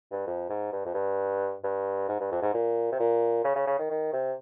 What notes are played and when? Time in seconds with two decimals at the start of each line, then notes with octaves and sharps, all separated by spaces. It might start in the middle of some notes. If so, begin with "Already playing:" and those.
0.11 G2
0.27 F2
0.50 G#2
0.72 G2
0.85 F2
0.94 G2
1.64 G2
2.09 G#2
2.20 G2
2.32 F2
2.42 G#2
2.54 A#2
2.92 C3
3.00 A#2
3.44 C#3
3.56 C#3
3.67 C#3
3.79 D#3
3.91 D#3
4.13 C3